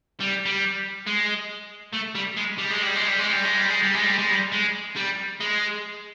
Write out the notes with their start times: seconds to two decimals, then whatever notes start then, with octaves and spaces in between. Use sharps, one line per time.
0.20 G3
0.45 G3
1.07 G#3
1.94 A3
2.15 G3
2.36 G#3
2.58 G3
2.70 G#3
2.83 G3
2.96 G#3
3.07 G3
3.19 G#3
3.33 G3
3.45 G#3
3.58 G3
3.70 G#3
3.83 G3
3.94 G#3
4.06 G3
4.19 G#3
4.32 G3
4.52 G#3
4.96 G3
5.40 G#3